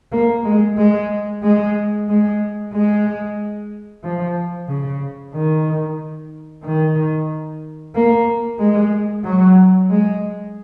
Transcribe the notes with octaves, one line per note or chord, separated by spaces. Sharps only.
A#3
G#3
G#3
G#3
G#3
G#3
F3
C#3
D#3
D#3
A#3
G#3
F#3
G#3